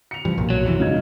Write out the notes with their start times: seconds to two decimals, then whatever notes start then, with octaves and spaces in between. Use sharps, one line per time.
0.11 C#7 F7
0.25 G2 F3
0.38 B1 A#2
0.50 F#3
0.65 F#2 C3 E3
0.80 E1 C#3 D#4 G#6